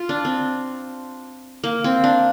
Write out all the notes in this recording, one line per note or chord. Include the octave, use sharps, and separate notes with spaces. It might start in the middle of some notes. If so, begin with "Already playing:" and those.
Already playing: F4
D4
C4
A#3
C4
D4